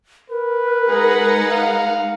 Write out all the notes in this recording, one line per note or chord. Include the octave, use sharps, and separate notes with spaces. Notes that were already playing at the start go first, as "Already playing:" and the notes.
A#4 B4
G#3 D#4 G#4 F#5
F5